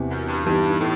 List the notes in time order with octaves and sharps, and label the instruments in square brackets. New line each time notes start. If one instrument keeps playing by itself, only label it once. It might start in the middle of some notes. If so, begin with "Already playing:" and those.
Already playing: [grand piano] E2 C3 E3
[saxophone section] F#2
G2
[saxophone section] G2 [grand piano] E3 B3 D#4 G4
[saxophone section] A2